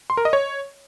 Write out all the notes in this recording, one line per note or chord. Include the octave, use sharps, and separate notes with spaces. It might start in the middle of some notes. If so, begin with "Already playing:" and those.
C6
A#4
D#5
C#5